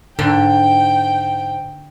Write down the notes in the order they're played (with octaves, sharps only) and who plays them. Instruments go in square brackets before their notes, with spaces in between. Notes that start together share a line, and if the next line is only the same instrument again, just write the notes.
[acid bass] G#2 [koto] D3 [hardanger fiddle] G5